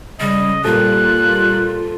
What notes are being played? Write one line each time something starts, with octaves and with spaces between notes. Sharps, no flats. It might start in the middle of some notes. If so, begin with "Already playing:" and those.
C#3 G3 D#5
A#2 G3 A#3 F4 A4 C5 F#6